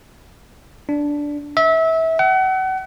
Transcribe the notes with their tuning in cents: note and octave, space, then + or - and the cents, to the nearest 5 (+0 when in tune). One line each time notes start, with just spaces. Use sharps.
D4 -5
E5 -25
F#5 +35